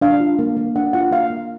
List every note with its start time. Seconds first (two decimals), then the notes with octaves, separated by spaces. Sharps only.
0.01 D4 F5
0.20 F4
0.39 A#3
0.57 A#3
0.75 D4 F#5
0.93 F4 F#5
1.11 A#3 F5
1.30 A#3